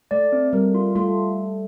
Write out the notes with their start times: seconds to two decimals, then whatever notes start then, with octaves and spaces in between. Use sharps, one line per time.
0.11 A3 D5
0.32 C4
0.53 G3 A#4
0.75 F4
0.95 A3 F4